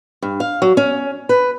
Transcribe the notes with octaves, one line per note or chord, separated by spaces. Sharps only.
G2
F5
F#3
C#4
B4